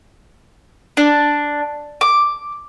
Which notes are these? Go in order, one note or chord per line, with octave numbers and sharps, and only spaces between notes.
D4
D6